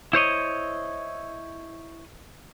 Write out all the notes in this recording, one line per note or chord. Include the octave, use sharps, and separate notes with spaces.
E4 C5 C#5 D#5